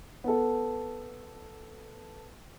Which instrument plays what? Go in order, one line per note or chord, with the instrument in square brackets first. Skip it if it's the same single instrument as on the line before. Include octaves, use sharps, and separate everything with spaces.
[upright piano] B3 A4